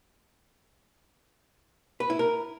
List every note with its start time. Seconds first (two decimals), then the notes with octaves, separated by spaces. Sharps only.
2.00 B4
2.10 E4
2.19 A#4